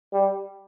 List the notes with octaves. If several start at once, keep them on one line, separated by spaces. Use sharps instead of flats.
G3